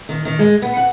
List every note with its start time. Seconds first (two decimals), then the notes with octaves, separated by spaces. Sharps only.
0.09 D#3
0.25 D#3
0.39 G#3
0.62 B3
0.77 F#5